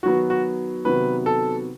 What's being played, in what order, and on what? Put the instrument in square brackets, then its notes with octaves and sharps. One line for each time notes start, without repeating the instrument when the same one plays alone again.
[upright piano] D#3 F#3 B3 F#4
F#4
C3 D#3 F#3 B3 B4
A4